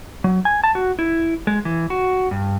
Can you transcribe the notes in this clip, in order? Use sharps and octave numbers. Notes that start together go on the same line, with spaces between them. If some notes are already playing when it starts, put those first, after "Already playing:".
F#3
G#5
A5
F#4
E4
G#3
E3
F#4
G2